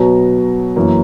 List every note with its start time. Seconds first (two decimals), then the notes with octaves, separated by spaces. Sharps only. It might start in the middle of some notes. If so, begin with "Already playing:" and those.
Already playing: B2 F#3 B3 A#5
0.76 F#2 E3 A#3